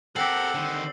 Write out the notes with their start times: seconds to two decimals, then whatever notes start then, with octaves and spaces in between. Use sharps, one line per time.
0.16 C4 G4 A4 A#4 F#5 E6 C7 F#7
0.55 D3 D#3